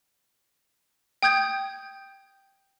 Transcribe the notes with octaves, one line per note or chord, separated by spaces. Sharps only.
G5 D#6 G6 G#6